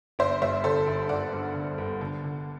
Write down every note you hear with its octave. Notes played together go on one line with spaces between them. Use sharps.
G1 C5 E5
G2 C5 E5
D3 A4 C5
G1
G1 D5 F#5
G2
D3
G1
D3
D3